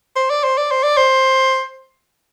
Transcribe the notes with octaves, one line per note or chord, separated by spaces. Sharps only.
C5
D5
C5
D5
C5
D5
C5